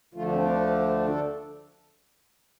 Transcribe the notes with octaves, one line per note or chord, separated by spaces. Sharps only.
D2 D3 F3 A3 F4
D4
C4
D4
A4